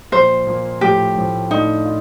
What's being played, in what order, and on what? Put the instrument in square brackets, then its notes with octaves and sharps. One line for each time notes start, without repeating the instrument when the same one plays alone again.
[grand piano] A#2 F3 A#3 [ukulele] C5
[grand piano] A#2 F3 A#3
[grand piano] A2 F3 A3 [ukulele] G4
[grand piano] A2 F3 A3
[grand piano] A2 F3 A3 D4 F4 [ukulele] D#4
[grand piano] F4